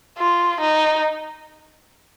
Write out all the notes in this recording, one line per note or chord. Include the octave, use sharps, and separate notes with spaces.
F4
D#4